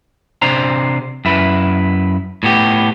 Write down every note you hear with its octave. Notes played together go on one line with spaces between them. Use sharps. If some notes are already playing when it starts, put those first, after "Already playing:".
C3 D4 C5 A#5
F#2 E4 B4
A2 B3 G4